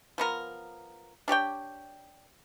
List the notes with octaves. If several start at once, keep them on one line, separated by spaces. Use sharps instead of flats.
F3 B3 A#4
D4 G4 C#5 G5